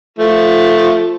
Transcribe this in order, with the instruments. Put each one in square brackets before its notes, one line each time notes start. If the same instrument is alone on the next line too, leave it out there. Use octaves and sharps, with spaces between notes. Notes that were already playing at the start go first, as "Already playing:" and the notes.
[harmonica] F3 A3